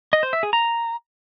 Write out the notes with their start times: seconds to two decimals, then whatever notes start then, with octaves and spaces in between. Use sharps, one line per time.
0.13 D#5
0.23 C5
0.33 E5
0.43 G#4
0.53 A#5